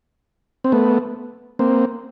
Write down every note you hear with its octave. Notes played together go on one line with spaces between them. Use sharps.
C4
A3 B3
A#3 C4